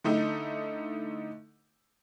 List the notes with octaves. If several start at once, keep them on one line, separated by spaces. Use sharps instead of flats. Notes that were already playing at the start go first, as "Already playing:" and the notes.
D3 A3 D#4 E4